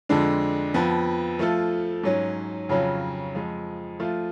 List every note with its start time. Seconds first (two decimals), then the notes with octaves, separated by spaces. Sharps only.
0.09 F2 D3 G#3 D4
0.74 F2 F3 B3
1.39 F3 A3 F4 A4
2.03 G#2 F#3 C#4
2.69 F2 C#3 F#3 C#4 F4
3.35 F2 F3 G#3
3.99 F3 A3 F4